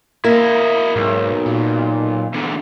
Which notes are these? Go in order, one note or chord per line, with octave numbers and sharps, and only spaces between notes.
A#3 E4 D#5
B1 G#2
A#2
E2 D3